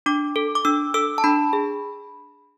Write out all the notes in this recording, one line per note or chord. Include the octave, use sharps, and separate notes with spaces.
D4 D6
A4
D6
D4 E6
A4 E6
A5
D4 B5
G#4